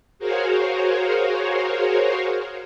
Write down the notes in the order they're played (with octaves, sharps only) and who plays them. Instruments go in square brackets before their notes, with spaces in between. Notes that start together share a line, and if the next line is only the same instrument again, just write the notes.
[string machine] F#4 G#4 A#4 C5 C#5 F5